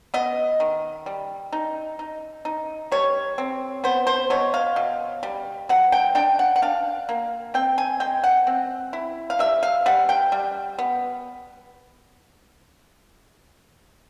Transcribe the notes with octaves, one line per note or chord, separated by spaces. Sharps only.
B3 D#5
D#3
G3
D#4
D#4
D#4
G3 C#5
C4
B3 C5
C5
B2 C#5
F5
B2
G3
F#3 F#5
G5
D4 G5
F#5
F#5
D4 F5
A#3
C4 G5
G#5
G#3 G5
F#5
C4
E4
F5
G3 E5
F5
G3 F#5
G5
G3
B3